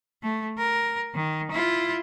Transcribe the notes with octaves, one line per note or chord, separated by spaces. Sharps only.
A3
A#4
D#3
E4 F4